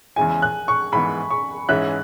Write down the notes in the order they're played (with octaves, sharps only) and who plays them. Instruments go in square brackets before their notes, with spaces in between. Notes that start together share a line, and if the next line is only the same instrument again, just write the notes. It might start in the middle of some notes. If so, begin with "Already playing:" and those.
[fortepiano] E2 C#3 G#3 E4 [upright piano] G#5
[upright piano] F#6
C#6
[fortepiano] G#2 E3 B3 [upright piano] B5
[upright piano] C#6
[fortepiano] G#2 E3 C#4 G#4 E5 [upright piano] F#6